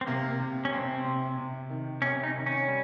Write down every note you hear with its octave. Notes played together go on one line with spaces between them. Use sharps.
C4
C3 A#3
C3
C#4
C3 C4
C3
C3
D#3
C3 C#4
D#4
D#3
C#4
G3